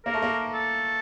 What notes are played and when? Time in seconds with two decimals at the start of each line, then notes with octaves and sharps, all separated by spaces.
0.06 A#3 A#4
0.14 A3
0.22 A#3
0.53 A4